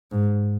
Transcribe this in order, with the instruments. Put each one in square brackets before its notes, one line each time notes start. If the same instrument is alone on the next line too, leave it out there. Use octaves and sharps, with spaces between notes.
[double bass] G#2